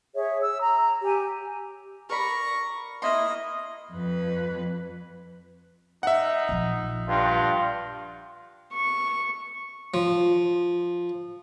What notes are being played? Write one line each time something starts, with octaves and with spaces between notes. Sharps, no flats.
G#4 C#5 E5
E6
A#5
G4 G#5
A#4 D5 B5 C#6 A#6
A#3 E4 D#5 C6
F2 B4
D#4 E5 F#5
A#1 F3
G2 F4
C#6
F3